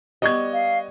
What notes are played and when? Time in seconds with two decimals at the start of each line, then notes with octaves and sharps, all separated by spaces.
0.22 G3 B3 D#5 C#6 G#6
0.53 F5